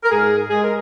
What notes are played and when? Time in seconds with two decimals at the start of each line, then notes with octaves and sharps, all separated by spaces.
0.04 A#4
0.11 G#2 G#4
0.50 G#3 G#4
0.63 A#4